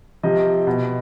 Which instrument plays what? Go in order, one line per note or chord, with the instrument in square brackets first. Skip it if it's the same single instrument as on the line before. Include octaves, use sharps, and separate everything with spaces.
[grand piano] C3 F3 D#5
B2